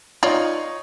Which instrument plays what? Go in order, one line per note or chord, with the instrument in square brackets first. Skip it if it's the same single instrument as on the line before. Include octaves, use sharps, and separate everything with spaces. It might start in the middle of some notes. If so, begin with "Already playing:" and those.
[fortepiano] D#4 C#5 [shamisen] F4 D5